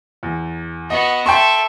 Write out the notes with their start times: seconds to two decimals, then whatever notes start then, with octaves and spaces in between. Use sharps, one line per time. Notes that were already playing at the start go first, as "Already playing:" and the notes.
0.23 E2
0.90 B3 F#4 D#5
1.26 A4 E5 G5 C6 C#6